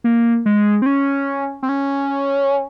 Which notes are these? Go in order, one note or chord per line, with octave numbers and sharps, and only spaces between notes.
A#3
G#3
C4
C#4
C4
C#4